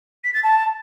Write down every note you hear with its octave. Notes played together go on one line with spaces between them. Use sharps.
B6
A6
A5